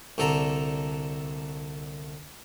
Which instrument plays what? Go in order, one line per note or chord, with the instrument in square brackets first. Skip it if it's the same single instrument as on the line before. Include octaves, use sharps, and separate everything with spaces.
[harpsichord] C2 D3 A4 A#5